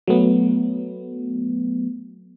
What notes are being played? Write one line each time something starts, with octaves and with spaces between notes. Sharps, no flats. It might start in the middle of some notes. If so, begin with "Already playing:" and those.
F#3 A3 B3